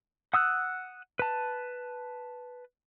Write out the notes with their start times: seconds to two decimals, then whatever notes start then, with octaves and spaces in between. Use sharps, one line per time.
0.34 F#5 D#6 E6 F#6
1.19 B4 A5